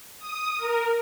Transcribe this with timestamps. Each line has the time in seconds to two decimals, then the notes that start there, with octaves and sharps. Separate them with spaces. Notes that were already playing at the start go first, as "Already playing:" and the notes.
0.19 D#6
0.57 A#4